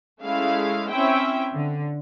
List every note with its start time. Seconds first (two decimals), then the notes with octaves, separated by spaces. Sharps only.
0.22 G#3 A3 C#4 E4 F5
0.90 C4 C#4 E4 C5 E5 G5
1.52 D3